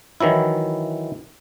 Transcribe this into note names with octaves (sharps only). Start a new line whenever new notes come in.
D#3 E3 F#3 E4